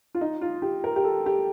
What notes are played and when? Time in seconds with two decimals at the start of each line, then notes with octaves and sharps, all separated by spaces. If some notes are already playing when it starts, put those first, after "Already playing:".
0.15 F4
0.21 D#4
0.41 F4
0.62 G4
0.84 A#4
0.96 G4
1.04 A4
1.26 G4